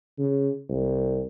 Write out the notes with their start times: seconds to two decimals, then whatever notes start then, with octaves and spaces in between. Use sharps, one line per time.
0.18 C#3
0.69 C2